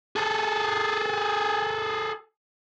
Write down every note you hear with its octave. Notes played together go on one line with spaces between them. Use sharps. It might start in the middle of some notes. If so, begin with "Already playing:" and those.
G#4 A4